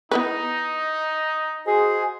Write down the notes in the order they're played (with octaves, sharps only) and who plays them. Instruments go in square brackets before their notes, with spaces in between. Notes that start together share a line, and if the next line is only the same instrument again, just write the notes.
[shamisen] B3 E4 B4 [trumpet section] D#4
[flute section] F#4 D#5 G#5 [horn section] G#4 C5